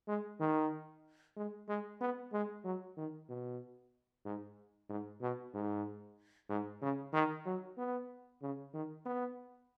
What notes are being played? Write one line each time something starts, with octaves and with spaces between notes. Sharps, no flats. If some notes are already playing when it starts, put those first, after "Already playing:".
G#3
D#3
G#3
G#3
B3
G#3
F#3
D#3
B2
G#2
G#2
B2
G#2
G#2
C#3
D#3
F#3
B3
C#3
D#3
B3